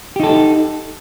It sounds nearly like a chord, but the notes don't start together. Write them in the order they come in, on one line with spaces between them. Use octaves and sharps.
G4 D#4 A4